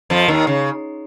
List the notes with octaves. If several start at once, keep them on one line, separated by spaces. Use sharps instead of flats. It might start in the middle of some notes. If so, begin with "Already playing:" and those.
F2 F3
D#2 D#3
C#3